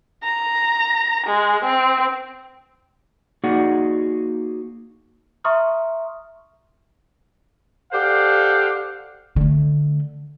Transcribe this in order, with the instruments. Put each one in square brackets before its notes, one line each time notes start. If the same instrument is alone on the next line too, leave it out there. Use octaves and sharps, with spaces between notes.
[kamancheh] A#5
G#3
C4
[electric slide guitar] A#3 D#4 F#4 G#4 D5 F#5
[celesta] E5 A#5 C6 C#6 D#6 F6
[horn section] G4 A4 C5 D5 F5 F#5
[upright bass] D3 A3